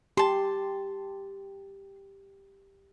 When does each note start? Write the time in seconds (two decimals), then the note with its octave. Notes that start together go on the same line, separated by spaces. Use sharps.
0.17 G4 A5 C6